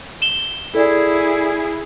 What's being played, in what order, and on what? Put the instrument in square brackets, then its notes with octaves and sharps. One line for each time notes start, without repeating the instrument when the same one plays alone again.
[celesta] E7 G7
[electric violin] E4 G#4 [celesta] A4 D5